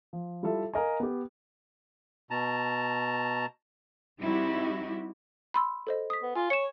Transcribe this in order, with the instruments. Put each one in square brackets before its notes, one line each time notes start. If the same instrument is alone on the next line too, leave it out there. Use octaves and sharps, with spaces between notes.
[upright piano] F3
G3 E4 F4 A4 E5
A#4 D#5 F5 G#5
B3 G4
[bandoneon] B2 A5 A#5
[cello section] G3 C4 D#4 E4 F#4 G4
[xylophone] B5 C6 E6
A4 C5 D#5
D#6 B6
[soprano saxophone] B3
[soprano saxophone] F4 [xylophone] G#5
[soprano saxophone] C#5 [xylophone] C#7 E7